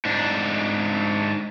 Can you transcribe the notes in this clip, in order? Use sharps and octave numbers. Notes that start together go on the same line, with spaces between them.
G#2 D4